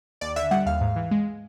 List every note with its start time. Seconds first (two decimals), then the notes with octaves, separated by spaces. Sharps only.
0.21 D#2 D5
0.36 D3 E5
0.51 G3 F#5
0.66 D#2 F5
0.81 G#2
0.96 E3
1.11 G#3